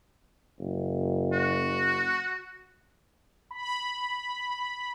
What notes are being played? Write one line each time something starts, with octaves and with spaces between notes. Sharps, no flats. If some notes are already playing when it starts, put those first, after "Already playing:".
F#1
F#4
B5